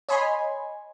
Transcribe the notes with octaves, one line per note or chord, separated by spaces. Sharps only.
C#5 D#5 G#5 B5 C6